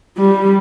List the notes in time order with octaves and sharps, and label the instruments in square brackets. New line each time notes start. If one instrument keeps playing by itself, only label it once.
[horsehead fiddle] G3